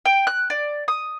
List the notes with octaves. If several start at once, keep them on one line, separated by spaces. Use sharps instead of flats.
G5
F#6
D5
D#6